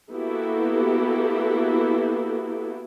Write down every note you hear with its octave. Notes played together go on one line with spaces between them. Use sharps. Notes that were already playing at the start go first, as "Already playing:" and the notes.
A#3 B3 E4 F#4 G4 A4